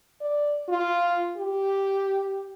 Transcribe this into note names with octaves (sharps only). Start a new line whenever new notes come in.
D5
F4
G4